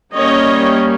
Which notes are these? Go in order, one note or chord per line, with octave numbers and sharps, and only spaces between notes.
G3 A#3 C#4 C#5 D#5